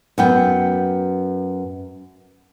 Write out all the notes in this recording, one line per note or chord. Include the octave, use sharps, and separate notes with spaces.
F#2 B3 G5